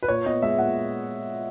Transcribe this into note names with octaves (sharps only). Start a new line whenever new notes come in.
B4
A#2 C#5
B3 D#5
G#3 E5
A#2 F#5